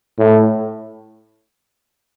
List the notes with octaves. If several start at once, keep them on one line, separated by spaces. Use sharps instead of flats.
A2